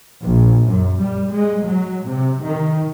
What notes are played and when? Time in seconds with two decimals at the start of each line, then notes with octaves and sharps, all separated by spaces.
0.23 A#1
0.68 F#2
1.03 G3
1.33 G#3
1.67 F#3
2.07 C3
2.44 D#3